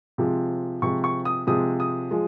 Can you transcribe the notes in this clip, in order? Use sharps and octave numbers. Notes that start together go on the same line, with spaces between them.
C3 F3 G#3
C3 F3 G#3 C#6
C#6
D#6
C3 F3 G#3 D#6
D#6
F3 G#3